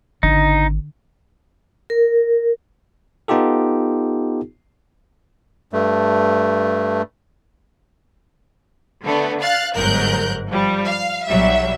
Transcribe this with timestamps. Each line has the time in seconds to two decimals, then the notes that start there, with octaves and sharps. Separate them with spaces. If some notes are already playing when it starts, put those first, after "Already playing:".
0.23 G#1 D3 D#4
1.90 A#4
3.28 B3 D#4 F4 G4 A4
5.73 G2 A3
9.03 D3 A3 B3
9.43 F5 F#6 A6
9.76 G1 G#2 F#3 A#4 F#6 G6
10.49 F3 G3
10.86 F5
11.27 B1 F#3 G3 E5